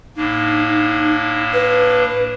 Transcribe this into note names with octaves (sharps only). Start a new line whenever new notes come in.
A2 A#3 D4 D#4
B4